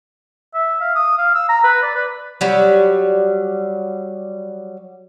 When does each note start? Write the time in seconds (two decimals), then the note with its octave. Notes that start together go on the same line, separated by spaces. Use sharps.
0.54 E5
0.81 F5
0.95 D#6
1.18 F5
1.35 E6
1.49 A#5
1.64 B4
1.82 D5
1.95 B4
2.41 F#3 G3